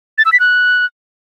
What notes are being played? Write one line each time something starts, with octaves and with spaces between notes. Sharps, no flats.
A6
E6
B6
F#6